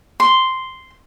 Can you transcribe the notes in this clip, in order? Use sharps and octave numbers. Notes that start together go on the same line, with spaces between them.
C6